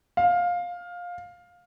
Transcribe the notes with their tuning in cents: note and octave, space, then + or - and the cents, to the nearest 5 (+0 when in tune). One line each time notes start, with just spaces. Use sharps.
F5 +15